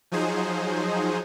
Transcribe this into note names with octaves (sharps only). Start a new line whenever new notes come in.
F3 F#3 D#4 G#4 C5